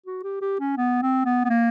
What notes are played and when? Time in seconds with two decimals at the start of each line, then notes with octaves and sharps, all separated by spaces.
0.06 F#4
0.24 G4
0.42 G4
0.60 C#4
0.77 B3
1.02 C4
1.25 B3
1.45 B3
1.50 A#3